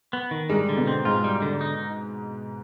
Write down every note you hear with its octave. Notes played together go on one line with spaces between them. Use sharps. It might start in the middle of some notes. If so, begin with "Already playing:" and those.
B3
D#3
G#2 G3 G#3
D3
B2 B3
C4
G#2 G#3 F4
G3
D3
D#4